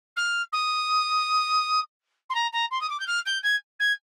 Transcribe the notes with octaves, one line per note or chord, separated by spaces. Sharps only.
F6
D#6
C6
A#5
A#5
C6
D#6
D6
G6
F6
G6
G#6
G#6